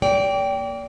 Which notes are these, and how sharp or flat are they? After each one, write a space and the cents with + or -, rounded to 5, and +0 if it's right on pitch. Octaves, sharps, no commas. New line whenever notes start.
A#3 -5 D5 -35 G5 +0